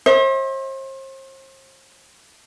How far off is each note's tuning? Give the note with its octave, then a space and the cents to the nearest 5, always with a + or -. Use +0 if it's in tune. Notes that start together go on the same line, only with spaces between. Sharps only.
C5 +40 E5 -40